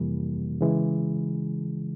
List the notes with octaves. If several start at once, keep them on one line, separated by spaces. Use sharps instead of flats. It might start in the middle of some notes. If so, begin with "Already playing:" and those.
Already playing: F2 C3 E3 G3 A#3
C#3 E3 G#3